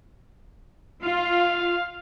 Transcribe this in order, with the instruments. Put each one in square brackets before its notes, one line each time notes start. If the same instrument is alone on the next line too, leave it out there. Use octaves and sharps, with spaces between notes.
[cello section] F4 [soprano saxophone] F5